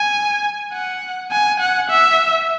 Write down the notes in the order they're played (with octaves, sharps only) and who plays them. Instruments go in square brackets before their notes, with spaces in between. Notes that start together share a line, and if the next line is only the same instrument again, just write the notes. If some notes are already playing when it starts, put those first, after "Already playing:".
Already playing: [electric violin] G#5
F#5
G#5
F#5
E5